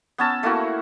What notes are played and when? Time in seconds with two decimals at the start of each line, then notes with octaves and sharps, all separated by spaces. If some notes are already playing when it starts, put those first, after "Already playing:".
0.18 B3 C#4 A5 E6
0.43 A3 A#3 E4 F#4